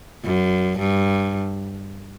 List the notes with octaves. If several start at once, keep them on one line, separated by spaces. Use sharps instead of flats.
F#2
G2